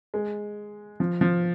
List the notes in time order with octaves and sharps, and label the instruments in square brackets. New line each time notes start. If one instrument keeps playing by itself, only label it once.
[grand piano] G#3
F3
F3